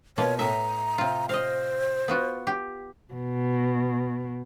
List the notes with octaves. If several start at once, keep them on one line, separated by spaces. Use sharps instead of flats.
B2 A#3 F4 C#5
A2 E5 A#5
C3 F4
C5 D#5 F5
B3 F4 F#4
G4
B2